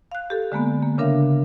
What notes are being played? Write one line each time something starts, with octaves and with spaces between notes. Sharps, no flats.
F5 F#6
G4 A4
D3 G#3 A#3 B3
A#3
C#3 D4 A#4 E5 F5